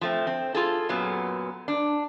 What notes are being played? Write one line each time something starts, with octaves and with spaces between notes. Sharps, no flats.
F3 A3 C4
C4
F4 G#4 A4
F#2 A#2 F#3 B3
D4